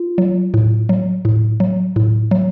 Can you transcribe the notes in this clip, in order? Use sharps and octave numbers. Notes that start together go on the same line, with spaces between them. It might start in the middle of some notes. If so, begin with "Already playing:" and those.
Already playing: F4
F#3
A2
F#3
A2
F#3
A2
F#3